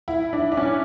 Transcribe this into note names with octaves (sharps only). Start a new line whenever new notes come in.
E4
D4
D4
C#4